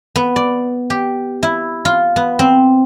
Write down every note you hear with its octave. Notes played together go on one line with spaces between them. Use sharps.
B3
D5
G4
E4
F4
B3
C4